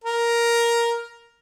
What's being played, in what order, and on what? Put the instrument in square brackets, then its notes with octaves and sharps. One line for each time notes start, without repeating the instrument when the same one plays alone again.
[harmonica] A#4